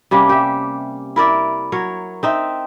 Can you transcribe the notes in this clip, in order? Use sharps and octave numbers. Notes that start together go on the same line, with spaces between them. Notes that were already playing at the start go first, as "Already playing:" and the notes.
C3 G3 A#3 C#4
G4 E5
E4 A#4 D5 E5
F#3 A#4 C#5
C4 D#4 E5